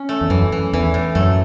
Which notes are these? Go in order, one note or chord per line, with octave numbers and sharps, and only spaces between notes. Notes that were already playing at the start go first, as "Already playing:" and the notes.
Already playing: C#4
A3
E2
F#2 E3
E3
E2 E3
A2
F#2 A3